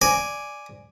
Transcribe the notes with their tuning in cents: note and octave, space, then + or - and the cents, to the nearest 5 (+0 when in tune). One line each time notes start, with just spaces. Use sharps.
D5 +0 G#5 +0